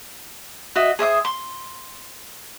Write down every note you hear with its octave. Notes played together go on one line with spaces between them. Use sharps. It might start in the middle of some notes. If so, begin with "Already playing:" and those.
F#4 D#5 E5
G#4 C5 E5 D#6
C6